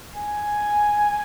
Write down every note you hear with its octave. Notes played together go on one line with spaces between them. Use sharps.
G#5